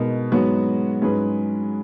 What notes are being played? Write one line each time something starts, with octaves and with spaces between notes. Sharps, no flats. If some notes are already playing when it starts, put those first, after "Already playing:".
Already playing: B2 G#3 B3 D#4 A#4
G#2 F#3 B3 F#4
G#2 F#3 C#4 G#4 B4